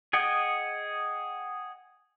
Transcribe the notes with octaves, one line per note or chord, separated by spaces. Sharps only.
G#4 D#5 F#5 G5